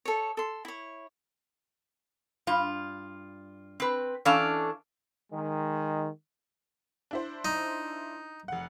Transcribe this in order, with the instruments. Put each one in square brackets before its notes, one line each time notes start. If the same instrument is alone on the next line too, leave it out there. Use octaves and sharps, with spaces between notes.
[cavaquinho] A4 C#5
A4 C6
E4 C#5
[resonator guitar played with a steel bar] G2 F4
C4 B4
E3 C#4 D4 A4 F5
[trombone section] D#3 G#3
[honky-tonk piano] D4 E4 C5
[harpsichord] D#4
[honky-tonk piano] F1 F#5